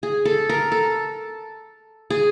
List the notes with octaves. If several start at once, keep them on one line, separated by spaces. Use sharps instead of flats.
G#4
A4
A#4
A4
G#4